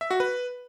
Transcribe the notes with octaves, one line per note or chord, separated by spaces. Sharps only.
E5
F#4
B4